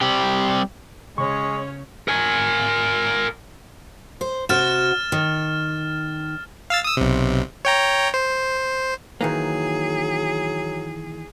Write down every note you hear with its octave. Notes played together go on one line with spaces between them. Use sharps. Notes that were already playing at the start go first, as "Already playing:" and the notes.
G3 C4 G4
C#3 G#3 C#4 C#5 C#6
A#4 G#5
C5
C3 F#4 F6 A6 E7
D#3
F5 E6 A6
D#6 E6
B1 C3
C#5 G5 A#5
C5
D#3 E3 F#3 A#3 G#4